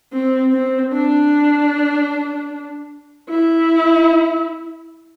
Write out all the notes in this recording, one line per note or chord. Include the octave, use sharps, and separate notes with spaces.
C4
C4
D4
E4